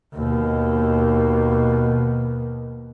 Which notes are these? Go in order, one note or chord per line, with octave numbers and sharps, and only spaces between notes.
D#2 B2